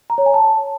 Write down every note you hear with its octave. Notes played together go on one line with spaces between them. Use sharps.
A#5
C#5
G#5
A5